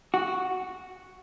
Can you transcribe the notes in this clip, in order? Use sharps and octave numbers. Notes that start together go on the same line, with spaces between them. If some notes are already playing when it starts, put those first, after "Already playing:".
F#4